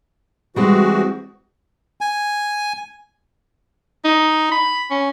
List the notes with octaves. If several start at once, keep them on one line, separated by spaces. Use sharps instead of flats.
E3 G3 G#3 C4 F#4
G#5
D#4
B5
C#4